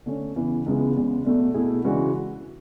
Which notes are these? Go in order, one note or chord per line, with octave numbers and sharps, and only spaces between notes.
D3 A3 C#4
E2 C#3 E3
C#2 C#3 E3 G#3 B3
E2 C#3 G#3
E2 B2 A3 D4
B2 A3 E4 G#4
C#3 E3 G#3 D4 F#4